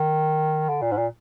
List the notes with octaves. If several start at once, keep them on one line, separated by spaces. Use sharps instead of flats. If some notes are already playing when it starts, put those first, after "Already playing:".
Already playing: D#3
D3
A#2
G#2
A#2